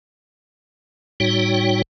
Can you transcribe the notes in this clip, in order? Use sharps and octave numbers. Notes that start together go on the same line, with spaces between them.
A2 G3 D#4 F#4 C#5 G5